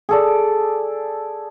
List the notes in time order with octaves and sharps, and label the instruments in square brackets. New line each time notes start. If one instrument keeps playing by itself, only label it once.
[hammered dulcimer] G#4 A4 D5